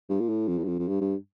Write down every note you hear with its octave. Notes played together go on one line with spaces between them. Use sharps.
G2
A#2
A2
F2
E2
G2
F2
F2
G2
G2